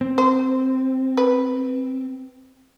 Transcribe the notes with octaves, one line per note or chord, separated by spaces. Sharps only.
C4
C5
B4